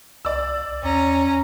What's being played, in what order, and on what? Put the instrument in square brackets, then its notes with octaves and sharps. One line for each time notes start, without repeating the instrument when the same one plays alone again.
[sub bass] C2 [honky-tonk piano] D5 E6
[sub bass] E2 [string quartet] C#4 A#5